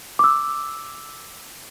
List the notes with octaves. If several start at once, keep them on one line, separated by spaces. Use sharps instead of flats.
D6 E6